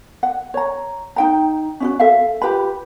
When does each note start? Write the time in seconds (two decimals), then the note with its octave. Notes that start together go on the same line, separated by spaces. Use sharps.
0.23 F#5
0.54 C#5 A#5
1.16 D#4 G5 A#5
1.80 C#4 E4 F#4
2.00 A4 E5 F5
2.42 F4 G4 B4 B5